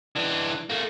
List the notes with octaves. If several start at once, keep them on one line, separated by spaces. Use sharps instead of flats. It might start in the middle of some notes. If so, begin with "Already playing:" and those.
E3 D4
A3 A#3